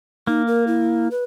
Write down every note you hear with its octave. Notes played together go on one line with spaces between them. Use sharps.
A#3 D#4
A#4
E4
B4